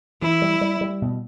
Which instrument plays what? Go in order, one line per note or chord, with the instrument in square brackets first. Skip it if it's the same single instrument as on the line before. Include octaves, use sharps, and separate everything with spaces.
[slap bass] E3 [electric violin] E4
[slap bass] G3
G3
G3
B2